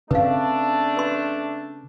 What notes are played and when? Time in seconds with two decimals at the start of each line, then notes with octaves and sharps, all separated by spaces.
0.11 C#3 A3 C4 D4 B4 F5
0.97 B4 C6